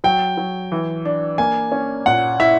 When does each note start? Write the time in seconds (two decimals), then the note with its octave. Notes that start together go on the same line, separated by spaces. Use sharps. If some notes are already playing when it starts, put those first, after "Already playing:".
0.04 F#3 G5
0.38 F#3
0.72 E3
1.05 D4
1.38 A#3 G#5
1.72 C#4
2.06 A#2 F#5
2.40 E4 E5